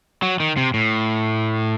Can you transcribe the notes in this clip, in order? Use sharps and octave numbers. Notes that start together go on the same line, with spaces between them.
F#3
D#3
C3
A2